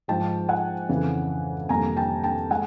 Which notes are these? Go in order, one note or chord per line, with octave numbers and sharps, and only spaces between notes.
G#2 F3 G#3 G5 A5
F#5 G#5
F2 C#3 E3
F2 C3 D#3 G3 A#3 G#5 A#5
G5 A5
G5 A5
G#3 F#5 G#5